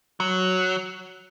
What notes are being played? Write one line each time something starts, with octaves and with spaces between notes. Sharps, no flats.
F#3